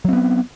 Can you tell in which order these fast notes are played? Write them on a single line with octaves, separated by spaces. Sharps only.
F#3 C4 B3